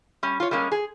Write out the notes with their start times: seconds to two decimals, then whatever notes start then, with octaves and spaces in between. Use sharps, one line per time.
0.23 G3 C#4
0.40 F4 C#5
0.51 G3 G#3 A#3 C#4
0.72 G#4